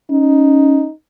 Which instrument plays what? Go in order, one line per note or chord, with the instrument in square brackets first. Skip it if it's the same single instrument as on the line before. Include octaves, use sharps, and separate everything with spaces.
[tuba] C#4 [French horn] D#4